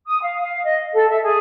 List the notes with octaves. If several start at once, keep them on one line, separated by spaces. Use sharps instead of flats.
D#6
F5
F5
D#5
A4
E5
G#4